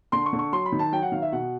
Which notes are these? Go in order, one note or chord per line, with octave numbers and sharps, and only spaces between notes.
D3 C6
C#6
D3
C#6
F#3 C6
B5
D#3
A5
F#3 G5
F#5
D#3 F5
E5
B2 F#5